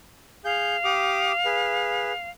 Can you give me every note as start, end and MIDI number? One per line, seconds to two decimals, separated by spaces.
0.45 0.76 68
0.45 2.30 77
0.45 0.76 91
0.84 1.32 67
0.84 1.32 86
0.84 1.32 87
1.45 2.12 68
1.45 2.12 71